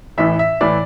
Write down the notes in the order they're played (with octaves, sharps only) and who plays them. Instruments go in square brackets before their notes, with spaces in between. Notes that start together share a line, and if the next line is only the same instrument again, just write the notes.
[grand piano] A1 A2 E3 E5
E5
A2 E3 D5